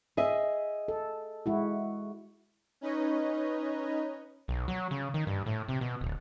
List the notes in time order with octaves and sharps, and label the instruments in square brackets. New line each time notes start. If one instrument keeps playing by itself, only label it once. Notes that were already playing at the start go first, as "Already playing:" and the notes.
[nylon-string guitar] G#4 D#5 E5
[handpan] A4
G#3 E4 F#4
[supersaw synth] C#4 D#4 B4 C#5 D#5
[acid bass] B1
F#3
C#3
D#3
G2
A2
C3
B2
D1